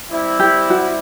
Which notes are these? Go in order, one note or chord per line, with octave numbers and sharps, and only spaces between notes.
G3 C4 E4
G4
F#4